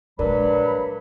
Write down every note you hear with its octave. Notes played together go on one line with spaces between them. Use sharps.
A#1 G2 F#3 G#3 D4 A#4 B5